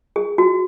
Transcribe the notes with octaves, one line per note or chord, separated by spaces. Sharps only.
G#4
F#4